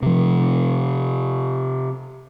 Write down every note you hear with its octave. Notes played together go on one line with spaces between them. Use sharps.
C3 F3